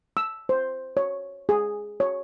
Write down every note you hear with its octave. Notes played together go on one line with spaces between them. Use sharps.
E6
C5
C#5
G#4
C#5